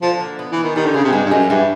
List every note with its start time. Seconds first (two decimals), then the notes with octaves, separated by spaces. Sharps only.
0.02 D3 F3
0.20 A#3
0.39 B3
0.52 E3
0.57 B3
0.64 D#3
0.76 D#3 G3
0.86 D3
0.94 C#3 G#4
1.04 C3
1.12 G2 G#3
1.25 G2
1.31 F#2 G#3
1.49 G2 E3